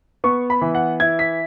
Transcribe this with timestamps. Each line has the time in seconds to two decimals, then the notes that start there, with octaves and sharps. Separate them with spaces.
0.24 B3 C#6
0.50 B5
0.61 E3
0.75 F#5
1.00 E4 G#6
1.19 B6